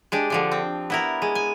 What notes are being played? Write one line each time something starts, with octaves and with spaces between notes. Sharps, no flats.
G#3 D4 G4
D3 F3 D4
C4
B3 E4 A#4
G#3
G#5